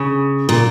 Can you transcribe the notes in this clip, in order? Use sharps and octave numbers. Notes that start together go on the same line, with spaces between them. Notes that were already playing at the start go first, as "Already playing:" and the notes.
Already playing: C#3
A#2